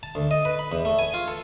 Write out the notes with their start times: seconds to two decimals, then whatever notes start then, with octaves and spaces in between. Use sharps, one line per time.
0.03 A5
0.15 D2
0.31 D#5
0.45 B4
0.59 B5
0.72 E2
0.85 A3
0.99 G#5
1.14 F4
1.28 A4